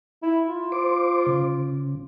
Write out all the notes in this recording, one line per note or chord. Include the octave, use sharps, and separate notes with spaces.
E4
F4
C5 D6
C#3